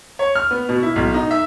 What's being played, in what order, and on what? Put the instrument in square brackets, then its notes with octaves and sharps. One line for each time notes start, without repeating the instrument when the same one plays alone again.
[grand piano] C#5
F6
B3
B2
E4
B1
D#4
E5